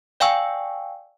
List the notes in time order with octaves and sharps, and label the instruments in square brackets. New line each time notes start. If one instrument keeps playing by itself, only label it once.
[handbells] D5 F5 G5 G#5 C#6 E6